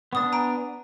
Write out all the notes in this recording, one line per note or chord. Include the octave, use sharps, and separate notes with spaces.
B3 D4 C#6 D#6 A6
G#5 A#5 D7